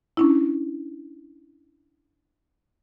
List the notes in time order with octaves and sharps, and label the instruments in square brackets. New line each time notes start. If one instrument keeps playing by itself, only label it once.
[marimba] C#4 D4 E4